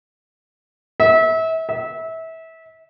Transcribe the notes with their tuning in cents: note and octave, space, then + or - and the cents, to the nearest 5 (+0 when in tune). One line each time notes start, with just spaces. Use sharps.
E5 -30
E5 -25